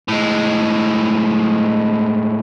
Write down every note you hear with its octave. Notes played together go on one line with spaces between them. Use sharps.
A2 G#3